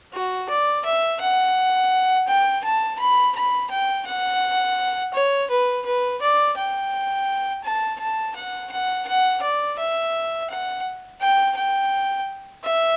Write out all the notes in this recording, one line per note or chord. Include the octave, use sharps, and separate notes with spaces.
F#4
D5
E5
F#5
G5
A5
B5
B5
G5
F#5
C#5
B4
B4
D5
G5
A5
A5
F#5
F#5
F#5
D5
E5
F#5
G5
G5
E5